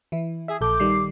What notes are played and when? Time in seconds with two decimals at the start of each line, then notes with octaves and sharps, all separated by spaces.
0.12 E3 E4
0.48 G#4 E5
0.61 A#1 A4 D6 G6
0.80 D#3 G3 C7